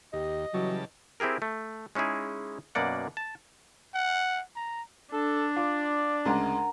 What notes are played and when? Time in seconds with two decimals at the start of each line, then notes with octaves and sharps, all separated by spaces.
0.13 D#2 G4 D#5
0.54 C#3 E3 F#3 G3 A5
1.20 C4 E4 G4 G#4 A#4
1.42 A3
1.95 G#3 C#4 D#4 E4 G#4
2.75 F#2 B2 A#3 D5 F#5
3.17 A5
3.95 F#5
4.56 A#5
5.13 D4 A4
5.56 F4 D5
6.25 D2 C#3 G#3 A#4 F#5 A#5